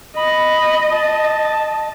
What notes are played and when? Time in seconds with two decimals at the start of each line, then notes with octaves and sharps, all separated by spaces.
0.17 D#5 B5
0.92 A5